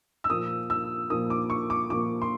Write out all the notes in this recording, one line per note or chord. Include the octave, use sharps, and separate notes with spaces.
E6
A#2 F3 A#3 D#6
E6
A#2 F3 A#3 D#6
D6
C#6
D6
A#2 F3 A#3 D6
C6